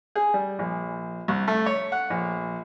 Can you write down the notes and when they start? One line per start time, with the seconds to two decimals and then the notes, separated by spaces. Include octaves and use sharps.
0.15 G#4
0.34 G3
0.59 A#1
1.28 C2
1.48 A3
1.66 C#5
1.92 F#5
2.10 A#1